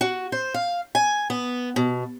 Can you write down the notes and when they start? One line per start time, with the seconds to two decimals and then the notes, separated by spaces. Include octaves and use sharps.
0.01 F#4
0.32 C5
0.54 F5
0.95 G#5
1.30 B3
1.76 B2